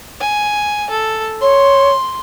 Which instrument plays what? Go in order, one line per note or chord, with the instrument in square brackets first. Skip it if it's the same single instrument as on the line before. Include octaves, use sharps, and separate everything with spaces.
[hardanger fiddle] G#5
A4
[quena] C#5 [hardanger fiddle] C6